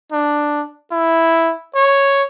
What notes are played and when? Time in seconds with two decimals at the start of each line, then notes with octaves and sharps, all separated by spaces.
0.12 D4
0.92 E4
1.75 C#5